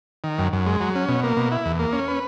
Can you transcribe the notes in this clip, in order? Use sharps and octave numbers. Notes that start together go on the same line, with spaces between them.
D#3
F#2
F#2
G#3
F#3
C#4
B2
A#3
B2
E4
E2
A#3
C#4
B4